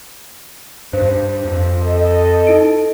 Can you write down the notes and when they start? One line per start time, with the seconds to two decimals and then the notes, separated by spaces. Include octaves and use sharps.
0.93 G2 D4 C5
1.45 F2
1.83 A4 D#5
2.47 D#4 E4 D7